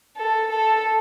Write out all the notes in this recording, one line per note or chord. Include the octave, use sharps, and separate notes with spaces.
A4
A4